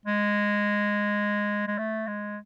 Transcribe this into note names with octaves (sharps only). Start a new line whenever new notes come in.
G#3
G#3
A3
G#3